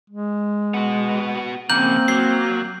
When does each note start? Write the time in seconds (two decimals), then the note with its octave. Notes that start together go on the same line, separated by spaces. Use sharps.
0.10 G#3
0.74 B3 F#4
1.70 F2 C#3 A#3 C4 G6 F#7
2.08 F#3 C7